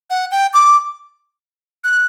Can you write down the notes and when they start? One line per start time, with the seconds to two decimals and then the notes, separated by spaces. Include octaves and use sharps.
0.10 F#5
0.31 G5
0.54 D6
1.84 F#6